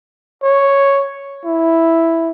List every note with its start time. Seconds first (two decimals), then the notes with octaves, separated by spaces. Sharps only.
0.43 C#5
1.45 E4